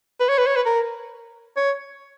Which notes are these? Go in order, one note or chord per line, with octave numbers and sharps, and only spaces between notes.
B4
C#5
B4
C#5
B4
A#4
C#5